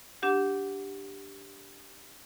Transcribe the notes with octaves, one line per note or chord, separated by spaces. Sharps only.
D4 G4 F#5